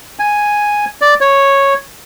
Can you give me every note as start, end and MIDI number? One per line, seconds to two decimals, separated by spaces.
0.19 0.85 80
1.01 1.14 74
1.21 1.74 73